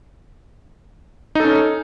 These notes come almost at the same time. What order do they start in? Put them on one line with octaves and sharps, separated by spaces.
D#4 A4 C#4